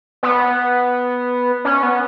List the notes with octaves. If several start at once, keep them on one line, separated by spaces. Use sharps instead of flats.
B3
C#4
B3